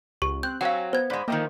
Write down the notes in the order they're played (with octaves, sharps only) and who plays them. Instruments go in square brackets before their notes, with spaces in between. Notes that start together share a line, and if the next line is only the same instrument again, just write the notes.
[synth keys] C#2 [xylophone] G4 C#6
[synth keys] C4 F#6 [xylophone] G6
[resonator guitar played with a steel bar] F#3 C4 [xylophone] F5 F#5 [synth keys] G#5 C#6 E6
[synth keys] B3 [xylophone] C5 G#6
[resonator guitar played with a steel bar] G#2 G#3 [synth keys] D5 B5
[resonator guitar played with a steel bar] D#3 F3 A3 [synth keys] A#3 D#5 G5